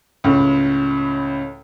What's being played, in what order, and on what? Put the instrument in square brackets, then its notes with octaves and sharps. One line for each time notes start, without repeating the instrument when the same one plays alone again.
[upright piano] C#2 A2